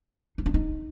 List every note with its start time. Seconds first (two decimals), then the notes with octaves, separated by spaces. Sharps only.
0.38 D#4
0.46 D4
0.54 D#4